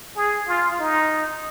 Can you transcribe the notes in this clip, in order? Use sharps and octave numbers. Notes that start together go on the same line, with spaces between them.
G#4
F4
D#4